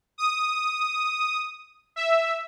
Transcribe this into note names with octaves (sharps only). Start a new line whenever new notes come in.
D#6
E5